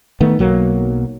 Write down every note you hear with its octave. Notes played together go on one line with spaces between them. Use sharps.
D#3 A3 B3
B1 F#3 A#3